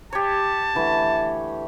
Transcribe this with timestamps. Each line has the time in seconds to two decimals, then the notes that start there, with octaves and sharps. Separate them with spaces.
0.13 G4 C#5 A5
0.74 D3 E3 A3